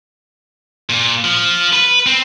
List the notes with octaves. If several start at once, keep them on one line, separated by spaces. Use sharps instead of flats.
A#2
F3
B4
C4